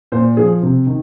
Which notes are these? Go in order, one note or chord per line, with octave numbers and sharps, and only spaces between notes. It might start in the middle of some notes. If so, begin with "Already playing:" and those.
A#2 C5
F3 G#4
C3
D#3